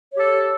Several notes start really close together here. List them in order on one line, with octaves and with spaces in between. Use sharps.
C#5 G4 A4